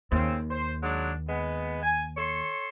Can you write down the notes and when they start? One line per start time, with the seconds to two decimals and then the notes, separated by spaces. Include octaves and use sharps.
0.12 D#2 C#3 C4
0.51 C5
0.82 F#3 G#3 D4
1.28 G#3 B3
1.83 G#5
2.17 A4 C#5 C6